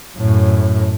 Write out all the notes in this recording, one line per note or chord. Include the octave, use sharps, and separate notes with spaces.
F#2 A2